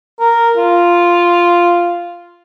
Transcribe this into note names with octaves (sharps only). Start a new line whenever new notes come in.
A#4
F4